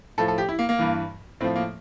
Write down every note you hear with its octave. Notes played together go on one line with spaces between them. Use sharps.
A2 F3 A4
A4
G4
E4
A#3
A#3
G2 E3
A2 F3 C4
A#3